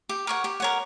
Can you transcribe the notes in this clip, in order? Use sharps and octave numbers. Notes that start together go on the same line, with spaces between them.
G4
A#4 C#5 F#5
G4
A#4 C#5 F#5